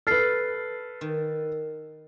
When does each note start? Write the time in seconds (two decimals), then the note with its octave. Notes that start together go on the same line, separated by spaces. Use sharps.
0.07 A4 B4 F6 A6 C7
1.01 D#3